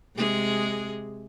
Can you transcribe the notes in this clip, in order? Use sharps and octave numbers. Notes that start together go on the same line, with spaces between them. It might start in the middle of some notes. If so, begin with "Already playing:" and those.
C3 G#3 G#4